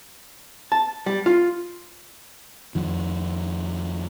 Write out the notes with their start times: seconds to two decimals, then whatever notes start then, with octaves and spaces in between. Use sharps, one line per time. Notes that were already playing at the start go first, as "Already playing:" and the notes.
0.72 A5
1.06 G3
1.26 F4
2.75 F2 D#3